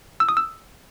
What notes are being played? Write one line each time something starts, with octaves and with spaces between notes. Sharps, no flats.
E6
D#6
E6